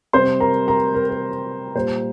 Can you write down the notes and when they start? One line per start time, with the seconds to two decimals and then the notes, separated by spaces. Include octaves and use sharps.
0.13 C3 G3 C5 C6
0.40 A#4 A#5
0.67 A#4 A#5
0.94 A#4
1.09 A#4
1.75 A#2 G3 C5